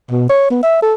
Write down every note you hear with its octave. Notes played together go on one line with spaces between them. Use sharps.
B2
C#5
B3
E5
A4